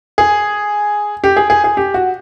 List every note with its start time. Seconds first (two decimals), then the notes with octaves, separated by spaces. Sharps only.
0.18 G#4
1.24 G4
1.37 G#4
1.50 G#4
1.64 G#4
1.77 G4
1.94 F#4